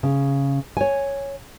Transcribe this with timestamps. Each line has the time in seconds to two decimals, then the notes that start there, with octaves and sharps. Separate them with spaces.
0.03 C#3
0.77 C#5 G#5